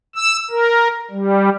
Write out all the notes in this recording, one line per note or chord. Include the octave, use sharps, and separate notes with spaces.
E6
A#4
G3